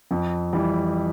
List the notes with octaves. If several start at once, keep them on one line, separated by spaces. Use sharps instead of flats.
F2
E3 G3